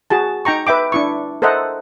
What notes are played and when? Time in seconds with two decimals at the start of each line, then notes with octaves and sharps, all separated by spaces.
0.10 F#4 G#4 A5
0.45 D#4 G5 A#5 C#6
0.67 B4 E5 G5 D6
0.92 D4 E4 C#6
1.42 A4 A#4 C5 D#5 E5 F#5